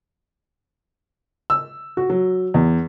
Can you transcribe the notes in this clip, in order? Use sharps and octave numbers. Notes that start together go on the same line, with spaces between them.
E6
F#4
F#3
E2